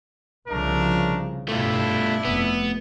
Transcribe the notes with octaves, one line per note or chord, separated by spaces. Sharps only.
C2 C#3 F3 A3 D4 A#4
G2 B2 A3 D4 E4 F4
F1 B3